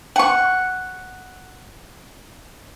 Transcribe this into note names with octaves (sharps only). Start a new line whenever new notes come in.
F#5 C#6